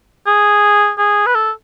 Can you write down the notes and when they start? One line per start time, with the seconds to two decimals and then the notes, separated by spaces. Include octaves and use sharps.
0.27 G#4
0.99 G#4
1.26 B4
1.35 A4